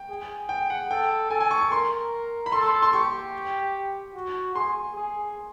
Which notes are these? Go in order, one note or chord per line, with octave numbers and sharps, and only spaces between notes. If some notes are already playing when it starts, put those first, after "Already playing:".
Already playing: G5
G#4
G5
F#5
A4 G5
A4 G#5
G#5
C#6
C#6
A#4 C6
B5
A4 C6
C6
C6
G4 C#6
F#4
G#4 C6
G#4